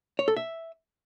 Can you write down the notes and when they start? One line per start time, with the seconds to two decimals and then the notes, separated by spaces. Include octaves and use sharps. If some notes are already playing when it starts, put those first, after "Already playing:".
0.19 C#5
0.28 A4
0.37 E5